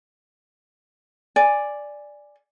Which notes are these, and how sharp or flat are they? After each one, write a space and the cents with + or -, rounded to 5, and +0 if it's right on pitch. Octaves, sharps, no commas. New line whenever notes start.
D5 +0 G#5 -10